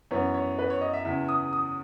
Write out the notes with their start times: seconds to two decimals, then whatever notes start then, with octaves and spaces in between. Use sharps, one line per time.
0.11 F#2 E3 B3 C#5
0.34 C#5
0.59 B4
0.70 C#5
0.81 D#5
0.93 E5
1.05 E2 C#3 E3 E5
1.28 D#6
1.53 D#6